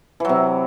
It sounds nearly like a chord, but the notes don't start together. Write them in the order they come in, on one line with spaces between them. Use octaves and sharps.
E3 F#3 C3